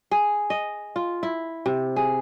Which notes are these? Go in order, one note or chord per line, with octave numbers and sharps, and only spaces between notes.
G#4
D#5
F4
E4
C3
G#4